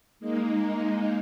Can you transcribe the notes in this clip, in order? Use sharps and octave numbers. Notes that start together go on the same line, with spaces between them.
G#3 A#3 D#4